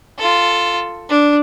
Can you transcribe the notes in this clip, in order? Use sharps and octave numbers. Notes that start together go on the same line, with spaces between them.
F4 A4
D4